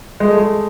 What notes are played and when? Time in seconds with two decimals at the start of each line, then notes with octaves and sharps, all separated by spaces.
0.20 G#3
0.29 A3
0.37 G#3